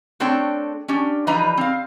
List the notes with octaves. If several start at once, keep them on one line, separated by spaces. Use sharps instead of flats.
A3 C4 D4 A4 C#5 G5
C#4 D4 G4
E3 F3 G3 D#4 B4 A#5
C4 F5